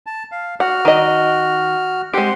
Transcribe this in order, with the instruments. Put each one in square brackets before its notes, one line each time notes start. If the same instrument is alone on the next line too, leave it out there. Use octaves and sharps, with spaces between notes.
[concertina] A5
F5
[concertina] F#4 F6 [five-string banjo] F#5
[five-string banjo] D#3 D#5
[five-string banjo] G#3 G4 [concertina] C4 F#5 C6